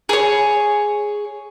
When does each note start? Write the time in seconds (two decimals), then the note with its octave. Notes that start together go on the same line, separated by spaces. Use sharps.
0.09 G#4 C#5